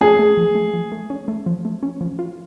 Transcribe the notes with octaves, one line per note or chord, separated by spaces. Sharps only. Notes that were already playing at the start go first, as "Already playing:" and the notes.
A3 G#4
A3
F3
A3
F3
A3
C#4
A3
F3
A3
C#4
F3
F4